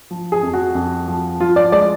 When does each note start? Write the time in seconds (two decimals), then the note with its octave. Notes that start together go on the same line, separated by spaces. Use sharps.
0.11 F3
0.32 G#4
0.43 F2
0.54 F#4
0.75 F2
1.07 F3
1.40 F3 F4
1.56 D5
1.72 G#3 D5